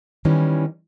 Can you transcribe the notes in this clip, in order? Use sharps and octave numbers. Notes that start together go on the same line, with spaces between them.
D#3 E3 G3 C#4